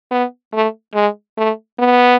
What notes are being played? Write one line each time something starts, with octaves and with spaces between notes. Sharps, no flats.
B3
A3
G#3
A3
B3